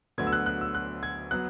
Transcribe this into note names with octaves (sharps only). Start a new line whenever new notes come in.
D2 D3 F#3 B3 G#6
E6
F#6
F#6
E6
F#6
G#6
F#3 B3 F#6